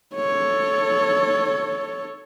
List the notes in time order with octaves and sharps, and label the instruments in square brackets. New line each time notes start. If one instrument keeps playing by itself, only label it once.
[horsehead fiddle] A4 C#5